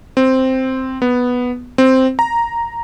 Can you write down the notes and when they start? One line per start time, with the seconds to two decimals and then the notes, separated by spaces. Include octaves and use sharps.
0.17 C4
1.02 B3
1.78 C4
2.19 A#5